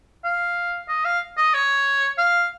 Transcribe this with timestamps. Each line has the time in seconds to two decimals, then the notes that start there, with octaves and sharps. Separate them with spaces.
0.24 F5
0.88 D#5
1.05 F5
1.37 D#5
1.54 C#5
2.18 F5